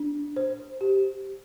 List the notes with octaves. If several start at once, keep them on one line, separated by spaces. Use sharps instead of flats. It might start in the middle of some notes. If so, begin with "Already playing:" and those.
Already playing: D4
C5
G4